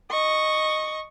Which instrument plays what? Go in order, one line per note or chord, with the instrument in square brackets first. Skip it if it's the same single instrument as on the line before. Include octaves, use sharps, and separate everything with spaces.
[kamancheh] D#5 C#6